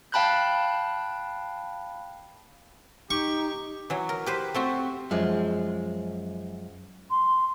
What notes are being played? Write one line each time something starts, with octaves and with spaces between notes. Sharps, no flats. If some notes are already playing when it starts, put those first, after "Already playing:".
F5 G5 A5 B5 F#6 G6
D#4 G4 C#6
E3 F#3
A#4
G4 B4 C5
A3 C4 F#4
F#2 F3 G#3
C6